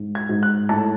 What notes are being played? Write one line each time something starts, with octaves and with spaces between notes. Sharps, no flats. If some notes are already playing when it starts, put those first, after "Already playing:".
Already playing: G#2
G#6
G#2
F#6
A2 A5